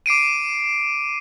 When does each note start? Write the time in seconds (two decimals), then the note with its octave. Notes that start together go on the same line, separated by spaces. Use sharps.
0.06 D6 C7 D7 D#7